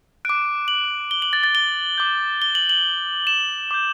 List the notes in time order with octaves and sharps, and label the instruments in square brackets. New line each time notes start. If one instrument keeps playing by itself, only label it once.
[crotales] D6 F#6 D7
F#7
G7
F#7
A6
A6
G7
D6 G6
G7
F#7
F#7
E7
D6 G6